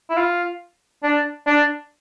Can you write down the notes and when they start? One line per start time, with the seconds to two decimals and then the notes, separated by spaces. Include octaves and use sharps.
0.10 E4
0.17 F4
1.04 D4
1.47 D4